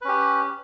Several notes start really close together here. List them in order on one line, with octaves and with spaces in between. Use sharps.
B4 C#4 G4